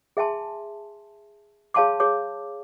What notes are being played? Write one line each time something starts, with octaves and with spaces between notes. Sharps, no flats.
G#4 E5 G#5 A5 C6
G#4 C#5 F5 A5 C6 D6
G#4 C#5 D6